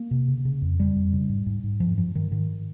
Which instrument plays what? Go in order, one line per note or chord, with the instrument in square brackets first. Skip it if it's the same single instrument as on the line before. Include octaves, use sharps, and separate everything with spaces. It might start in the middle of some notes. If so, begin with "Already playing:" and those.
Already playing: [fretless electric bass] A#3
C3
C#3
C#3
F2
C#3 G3
F2
C#3
G#2
G#2
G#2
G2 F3
G2 F3
G2 D#3
G#2 D#3